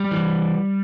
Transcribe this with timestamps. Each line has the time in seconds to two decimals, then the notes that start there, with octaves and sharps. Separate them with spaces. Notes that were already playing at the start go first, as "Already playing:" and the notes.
Already playing: G3
0.11 E3